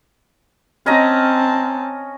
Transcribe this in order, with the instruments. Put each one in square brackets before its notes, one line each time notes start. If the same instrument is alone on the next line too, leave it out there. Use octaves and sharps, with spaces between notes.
[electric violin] C4 A5 [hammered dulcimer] C#4 D#5 A#5